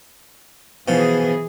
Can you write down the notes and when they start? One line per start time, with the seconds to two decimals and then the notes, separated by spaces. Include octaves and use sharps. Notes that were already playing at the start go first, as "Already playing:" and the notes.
0.88 B2 E3 F3 G#4